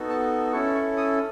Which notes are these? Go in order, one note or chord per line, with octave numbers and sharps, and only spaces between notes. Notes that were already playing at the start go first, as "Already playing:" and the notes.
Already playing: B3 D#4 F#4 A4
A5
C#4 E4 A4 C#6
C#6
D#6